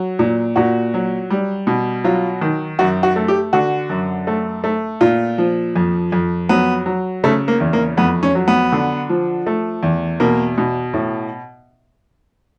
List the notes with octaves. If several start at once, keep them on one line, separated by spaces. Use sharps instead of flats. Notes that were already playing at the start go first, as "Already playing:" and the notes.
Already playing: F#3
A#2
A#2 F#4
F#3
G3
B2
F#3 F4
D#3
F#2 F#4
F#4
A3
G4
D3 F#4
F#2
A3
A3
A#2 F4
F3
F2
F2
F#3 B3
F#3
C#3 A3
A#3
E2
A#3
F2 B3
C#4
F#3
B3
D3
F3
A3
E2
B2 A#3
B2
A2